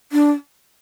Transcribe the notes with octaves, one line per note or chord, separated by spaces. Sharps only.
D4